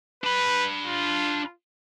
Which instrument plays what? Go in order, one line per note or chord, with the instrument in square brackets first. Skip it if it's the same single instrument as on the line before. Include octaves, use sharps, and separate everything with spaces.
[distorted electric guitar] D4 B5 [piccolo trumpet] B4
[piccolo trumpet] F4